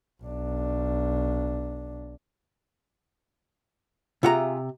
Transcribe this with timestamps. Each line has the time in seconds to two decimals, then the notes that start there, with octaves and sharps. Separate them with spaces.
0.23 B1 D4
4.23 C3 F4 G#4 E5 F#5 A#5